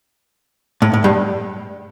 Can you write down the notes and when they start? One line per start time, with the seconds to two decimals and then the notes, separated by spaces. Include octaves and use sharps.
0.82 A2
0.93 A2
1.04 G2